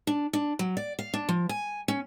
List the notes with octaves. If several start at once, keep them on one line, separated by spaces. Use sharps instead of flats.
D4
D4
F#3
D5
F5
D4
F3
G#5
C#4